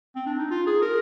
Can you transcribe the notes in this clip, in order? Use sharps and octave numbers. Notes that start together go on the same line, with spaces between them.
C4
D4
D#4
F4
G#4
A#4